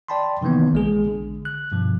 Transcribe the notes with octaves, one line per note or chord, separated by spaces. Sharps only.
D5 G5 A5 B5 C6
C3 D#3 E3 A#3 B3
A#1 G#3 G#4
D3
F#6
G2 B2 F3